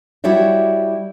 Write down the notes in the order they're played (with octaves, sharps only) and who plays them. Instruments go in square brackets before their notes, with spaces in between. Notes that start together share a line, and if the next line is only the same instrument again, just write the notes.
[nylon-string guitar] G3 E4 F#4 C#5 D5 E5